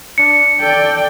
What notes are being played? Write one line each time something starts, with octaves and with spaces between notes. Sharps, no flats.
D4 C#7
A4 D5 G5